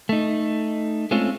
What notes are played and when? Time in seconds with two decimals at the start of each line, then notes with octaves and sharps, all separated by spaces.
0.09 A3 D#4
1.11 G#3 A3 C4 C#4 F4